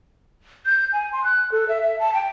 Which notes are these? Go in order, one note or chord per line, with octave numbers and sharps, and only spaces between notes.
G6
G#5
C6
F#6
A4
E5
E5
A5
G5